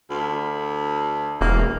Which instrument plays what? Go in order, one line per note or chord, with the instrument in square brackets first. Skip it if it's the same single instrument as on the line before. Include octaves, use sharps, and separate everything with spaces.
[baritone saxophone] D2
[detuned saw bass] E1 [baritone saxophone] A#3